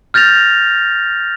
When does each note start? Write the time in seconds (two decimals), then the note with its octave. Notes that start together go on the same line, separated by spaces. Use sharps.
0.14 F6 G6 A6 A#6 F7